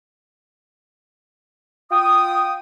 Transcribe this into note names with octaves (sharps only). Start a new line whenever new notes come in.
F4 G5 D#6